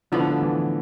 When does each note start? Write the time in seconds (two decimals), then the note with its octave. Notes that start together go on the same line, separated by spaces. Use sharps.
0.12 A2 D3 F3 B3 D4
0.42 E3